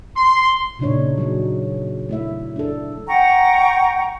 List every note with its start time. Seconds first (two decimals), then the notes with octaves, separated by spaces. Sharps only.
0.16 C6
0.79 A#2 C#3 D4 D#4 C#5
1.18 F#3 D#4 G#4
2.09 A3 E4 E5
2.56 D4 A4
3.08 F#5 G5 A#5 C#6